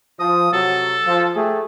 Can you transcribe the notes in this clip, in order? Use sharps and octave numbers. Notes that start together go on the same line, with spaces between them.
F3 D#6
C3 F#3 A4
F3
A3 G4 G#4